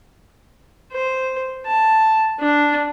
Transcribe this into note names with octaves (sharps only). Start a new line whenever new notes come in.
C5
A5
D4